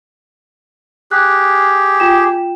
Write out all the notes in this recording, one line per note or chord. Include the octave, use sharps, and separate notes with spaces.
G4 G#4 F#6
F4 G5 E7